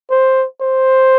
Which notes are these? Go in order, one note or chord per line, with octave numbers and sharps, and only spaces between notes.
C5
C5